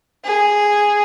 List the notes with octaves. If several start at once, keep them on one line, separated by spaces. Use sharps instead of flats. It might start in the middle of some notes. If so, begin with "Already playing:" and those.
G#4